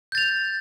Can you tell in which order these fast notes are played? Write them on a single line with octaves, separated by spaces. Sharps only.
G6 A6 F7